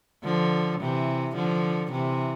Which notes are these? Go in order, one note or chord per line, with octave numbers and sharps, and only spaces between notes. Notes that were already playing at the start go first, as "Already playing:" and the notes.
D3 F3
C3 E3
D3 F3
C3 E3